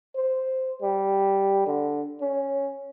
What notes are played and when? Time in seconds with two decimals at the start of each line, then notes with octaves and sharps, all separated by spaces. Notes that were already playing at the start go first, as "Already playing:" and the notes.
0.15 C5
0.82 G3
1.67 D3
2.21 C#4